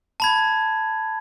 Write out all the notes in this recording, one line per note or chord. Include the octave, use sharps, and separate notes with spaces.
A5 B5 G#6